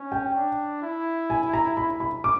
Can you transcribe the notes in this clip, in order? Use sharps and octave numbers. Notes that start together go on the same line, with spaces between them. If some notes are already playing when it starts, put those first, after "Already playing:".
Already playing: C#4
G5
D4
E4
G#5
A#5
B5
B5
D6